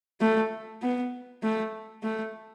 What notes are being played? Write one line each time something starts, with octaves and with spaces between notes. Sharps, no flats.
A3
B3
A3
A3